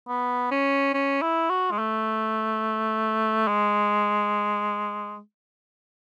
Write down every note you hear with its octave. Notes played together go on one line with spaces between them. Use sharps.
B3
C#4
C#4
E4
F#4
G#3
A3
G#3